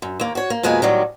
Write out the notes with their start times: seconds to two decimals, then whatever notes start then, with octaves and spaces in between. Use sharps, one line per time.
0.02 F#2
0.20 D#2 A#3
0.35 F#4 C#5
0.50 A#3
0.63 F2 B2 G#3 A#3 B4 G#5
0.82 A2 D#3 F#3 G3